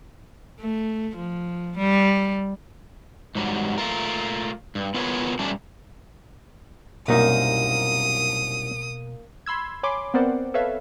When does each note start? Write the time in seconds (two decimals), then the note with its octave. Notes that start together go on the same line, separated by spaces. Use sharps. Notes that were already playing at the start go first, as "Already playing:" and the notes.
0.60 A3
1.16 F3
1.77 G3
3.35 G#2 F#3 G3
3.78 A3 F4 A#4
4.75 G2
4.94 B3 F4 G#4 A#4 C#5
5.39 G3 A3 C#4 D4
7.08 C2 F#2 B2 A#3 D#4 D#6
9.46 B5 C6 E6 G#6
9.83 C#5 G#5 B5 C6 D6
10.14 B3 C4 A#4 C5 D5 F#5
10.54 A4 B4 C#5 E5 F5